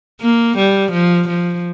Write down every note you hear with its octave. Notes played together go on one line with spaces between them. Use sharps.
A#3
G3
F3
F3